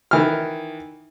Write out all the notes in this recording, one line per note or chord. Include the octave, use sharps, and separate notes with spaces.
D#3 E3 F6